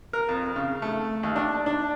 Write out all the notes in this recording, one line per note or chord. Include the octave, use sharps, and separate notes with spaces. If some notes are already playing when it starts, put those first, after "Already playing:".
A#4
F2
C#3
A3
D#2
D4
D4